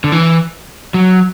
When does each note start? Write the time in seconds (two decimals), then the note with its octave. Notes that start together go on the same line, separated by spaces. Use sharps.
0.04 D3
0.12 E3
0.94 F#3